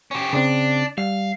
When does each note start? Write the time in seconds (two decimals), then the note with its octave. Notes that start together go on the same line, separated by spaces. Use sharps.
0.11 C#4 G4
0.33 C#3 C4 D4
0.98 G3 F5